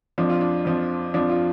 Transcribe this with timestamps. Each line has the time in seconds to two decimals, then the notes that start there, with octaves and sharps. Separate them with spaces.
0.18 F2 F3 D4
0.29 F4
0.41 D4
0.65 F2 F3
1.14 F2 F3 D4
1.30 F4